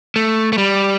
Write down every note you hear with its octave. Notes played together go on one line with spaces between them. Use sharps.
A3
A3
G3